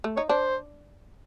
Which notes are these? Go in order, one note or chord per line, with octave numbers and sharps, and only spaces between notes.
A3
D#4 C#5
D4 C5